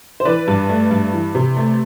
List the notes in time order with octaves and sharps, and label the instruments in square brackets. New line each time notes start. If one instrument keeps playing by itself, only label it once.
[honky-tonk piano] C5
E3 B4 D5
G2
A3
G2
E3
C3
A3